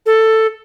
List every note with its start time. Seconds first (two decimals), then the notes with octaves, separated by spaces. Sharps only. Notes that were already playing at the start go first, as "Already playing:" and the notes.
0.06 A4